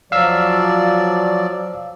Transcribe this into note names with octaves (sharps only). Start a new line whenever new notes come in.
F3 F#3 D5 F5 E6